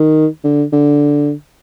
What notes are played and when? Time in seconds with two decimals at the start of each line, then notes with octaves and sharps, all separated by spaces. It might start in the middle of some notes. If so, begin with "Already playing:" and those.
Already playing: D#3
0.44 D3
0.72 D3